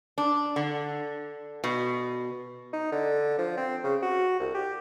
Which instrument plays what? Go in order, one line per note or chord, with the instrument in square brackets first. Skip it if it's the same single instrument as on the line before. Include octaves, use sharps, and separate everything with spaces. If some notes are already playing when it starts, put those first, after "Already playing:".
[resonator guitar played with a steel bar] D4
D3
B2
[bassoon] D#4
D3
F3
C4
C#3
F#4
C2
G4